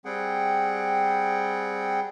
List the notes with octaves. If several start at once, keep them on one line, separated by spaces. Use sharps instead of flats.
G3 C4 G#4 F#5 G5